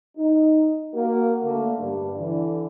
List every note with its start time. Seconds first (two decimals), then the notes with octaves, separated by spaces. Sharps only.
0.17 D#4
0.94 A#3 F#4 A#4
1.43 D3 A3 A#3
1.79 G2
2.17 D3 E3